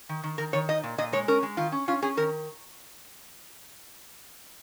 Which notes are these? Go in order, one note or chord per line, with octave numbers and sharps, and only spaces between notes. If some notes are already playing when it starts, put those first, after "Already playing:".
D#3
D#3
D#3 A#4
D#3 C#5
D#4 D#5
A#2
A#2 D#5
G#3 C#5
C#4 A#4
G#3
D#3 F4
C#4
C#4 F4
C#4 G#4
D#3 A#4